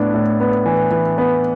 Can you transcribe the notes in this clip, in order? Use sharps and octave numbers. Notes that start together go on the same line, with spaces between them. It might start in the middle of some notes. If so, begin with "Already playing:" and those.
Already playing: A2 B3 D4
A2
B3
E3
E3
B3